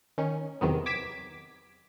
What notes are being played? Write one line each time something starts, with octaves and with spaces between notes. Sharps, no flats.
D#3 C#4
E2 C3 D#3 F#3 B3
D6 G#6 B6 D7 E7